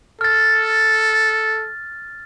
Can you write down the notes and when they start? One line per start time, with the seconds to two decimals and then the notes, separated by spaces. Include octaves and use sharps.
0.21 A4 F6 A6